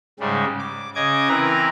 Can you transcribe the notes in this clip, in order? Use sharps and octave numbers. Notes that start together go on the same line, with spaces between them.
G#2 C#3 G3 G#3
D6
C#3 D#5 D6 G#6
E3 C4 A#4 B4 A#5